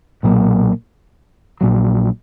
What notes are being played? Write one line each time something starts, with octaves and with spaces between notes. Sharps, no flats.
B1 A#2 F#3 A#3
A#1 A#2 F#3